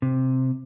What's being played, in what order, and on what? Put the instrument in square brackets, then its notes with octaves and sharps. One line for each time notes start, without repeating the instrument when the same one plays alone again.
[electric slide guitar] C3